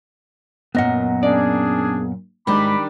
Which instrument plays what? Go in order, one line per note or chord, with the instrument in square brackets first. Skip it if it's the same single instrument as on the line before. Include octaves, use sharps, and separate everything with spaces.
[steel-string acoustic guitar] F#2 A#2 [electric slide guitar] B3 D#5 F#5
[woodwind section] C#4 D4 G#4 [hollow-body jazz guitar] D5
[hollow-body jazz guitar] G#2 [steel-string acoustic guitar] D#3 G3 D4 [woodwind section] B5 D6